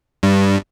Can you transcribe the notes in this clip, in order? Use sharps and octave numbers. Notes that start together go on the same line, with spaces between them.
G2